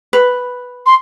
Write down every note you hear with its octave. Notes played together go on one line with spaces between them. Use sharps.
B4
C6